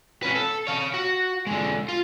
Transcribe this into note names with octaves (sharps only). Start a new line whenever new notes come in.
C#4 B4
A4
C#5 F5
F#4
D3 G#3
F4